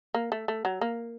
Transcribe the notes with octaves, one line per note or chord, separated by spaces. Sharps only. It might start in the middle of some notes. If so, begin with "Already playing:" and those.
A#3
A3
A3
F#3
A#3